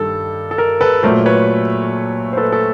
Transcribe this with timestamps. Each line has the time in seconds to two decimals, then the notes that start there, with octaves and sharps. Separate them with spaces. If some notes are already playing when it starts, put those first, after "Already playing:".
Already playing: G2 D#3 G3 A4
0.51 A4
0.58 A#4
0.81 A4 B4
1.03 A#2 F#3 A3 A#4 C5
1.26 B4 C#5
2.33 C5
2.37 A4 B4
2.52 A4 B4